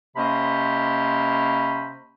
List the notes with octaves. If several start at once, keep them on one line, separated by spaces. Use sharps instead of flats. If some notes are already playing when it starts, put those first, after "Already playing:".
C3 A#3 C#4 C5 D#5 B5